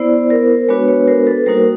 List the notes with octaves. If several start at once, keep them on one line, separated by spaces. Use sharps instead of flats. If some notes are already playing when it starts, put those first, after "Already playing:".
Already playing: B3 E4 C5 D5
A#4 C5
G#3 B3 D4 F#4 B4 C#5
B4 C#5
A#4 C5
A4 B4
G3 A#3 D#4 F#4 A#4 C5